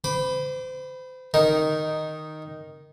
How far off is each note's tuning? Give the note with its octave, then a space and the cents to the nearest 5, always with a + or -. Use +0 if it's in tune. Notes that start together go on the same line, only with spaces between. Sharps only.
C5 -35 B5 +0 D6 -5
D#3 +0 D#4 -5 A#4 +0